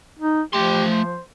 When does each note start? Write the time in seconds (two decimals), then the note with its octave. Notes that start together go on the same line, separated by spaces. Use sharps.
0.19 D#4
0.53 F3 A3 G4 C6
0.90 C5